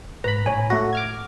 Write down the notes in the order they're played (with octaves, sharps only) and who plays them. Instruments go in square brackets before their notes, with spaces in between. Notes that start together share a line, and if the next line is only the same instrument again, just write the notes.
[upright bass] G#2 [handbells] B4 [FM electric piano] A#5 B5
[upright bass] A2 D#4 [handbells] C#5 G#5
[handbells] A3 A#6 [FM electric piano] F#4 A4
[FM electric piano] D6 F6 G#6